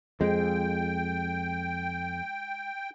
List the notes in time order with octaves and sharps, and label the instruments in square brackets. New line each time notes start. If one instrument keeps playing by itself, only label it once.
[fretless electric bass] F2 [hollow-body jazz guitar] G#3 [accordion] G5